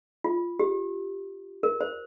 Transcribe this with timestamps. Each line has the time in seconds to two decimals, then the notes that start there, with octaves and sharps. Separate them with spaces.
0.24 F4
0.59 G4
1.63 A#4
1.81 C5